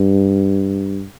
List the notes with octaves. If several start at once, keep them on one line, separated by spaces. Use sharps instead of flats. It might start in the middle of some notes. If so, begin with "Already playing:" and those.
Already playing: G2